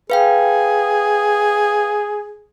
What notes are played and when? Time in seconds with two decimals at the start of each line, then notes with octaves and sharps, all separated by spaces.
0.10 G#4 B4 F5 G5